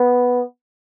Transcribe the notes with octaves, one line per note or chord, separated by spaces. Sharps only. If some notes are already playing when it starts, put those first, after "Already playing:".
Already playing: B3